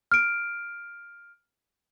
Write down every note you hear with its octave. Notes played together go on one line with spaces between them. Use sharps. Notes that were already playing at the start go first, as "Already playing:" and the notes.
F6 D7